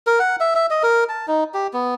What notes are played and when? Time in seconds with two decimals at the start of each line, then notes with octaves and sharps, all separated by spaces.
0.07 A#4
0.20 F#5
0.40 E5
0.55 E5
0.70 D#5
0.83 A#4
1.09 A5
1.28 D#4
1.54 G4
1.73 B3